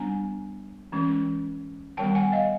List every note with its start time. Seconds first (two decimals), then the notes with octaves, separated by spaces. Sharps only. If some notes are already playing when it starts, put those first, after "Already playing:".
Already playing: G3 B3 D4 G#5 A#5
0.92 E3 G#3 C#4
1.97 D#3 G3 B3 G5 A5
2.15 F#5 G#5
2.32 D#5 F5